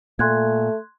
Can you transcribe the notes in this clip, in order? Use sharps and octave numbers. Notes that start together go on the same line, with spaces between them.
A#2 A3 C6 F#6 G#6